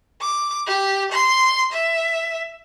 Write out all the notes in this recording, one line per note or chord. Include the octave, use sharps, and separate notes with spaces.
D6
G4
C6
E5